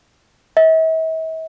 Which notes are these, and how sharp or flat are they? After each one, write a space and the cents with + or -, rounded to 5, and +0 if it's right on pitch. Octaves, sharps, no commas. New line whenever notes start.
E5 -45